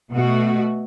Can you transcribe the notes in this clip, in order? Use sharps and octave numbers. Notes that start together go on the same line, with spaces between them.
B2 A3 F#4